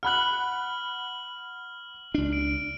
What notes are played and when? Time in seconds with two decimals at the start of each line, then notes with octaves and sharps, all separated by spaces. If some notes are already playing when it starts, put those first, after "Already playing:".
0.03 F#5 B5 F6 F#6 F#7
2.14 C#2 D4
2.33 D7